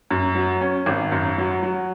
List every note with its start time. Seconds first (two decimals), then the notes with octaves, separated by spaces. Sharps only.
0.10 F#2
0.35 F#3
0.61 C#4
0.86 G#1
1.12 F#2
1.38 F#3
1.63 F#3